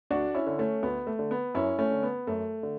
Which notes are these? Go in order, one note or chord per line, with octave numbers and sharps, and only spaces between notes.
D2 D4 F#4
C#4 E4
D3
A3 C#4
D2 B3
A3
D3
B3
F#2 C#4 E4
A3 C#4
D3
B3
F#2 A3
D3